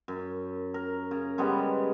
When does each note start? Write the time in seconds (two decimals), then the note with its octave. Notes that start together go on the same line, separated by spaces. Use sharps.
0.08 F#2
0.74 A#4
1.11 C#3
1.38 C#3 G3 G#3 B3